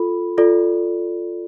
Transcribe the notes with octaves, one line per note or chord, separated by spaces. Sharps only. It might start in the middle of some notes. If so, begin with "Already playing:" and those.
Already playing: F4 A4 B5
F4 A4 D5